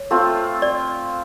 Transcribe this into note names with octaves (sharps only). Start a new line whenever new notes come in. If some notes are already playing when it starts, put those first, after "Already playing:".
Already playing: C#5
A3 C4 F4
D5